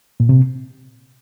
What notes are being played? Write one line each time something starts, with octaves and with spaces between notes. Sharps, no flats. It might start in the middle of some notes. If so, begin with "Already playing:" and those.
A#2
C3